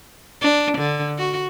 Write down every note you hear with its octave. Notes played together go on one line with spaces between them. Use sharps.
D4
D3
F#4